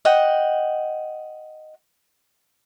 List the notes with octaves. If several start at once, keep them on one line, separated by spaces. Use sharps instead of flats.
D#5 F#5 G5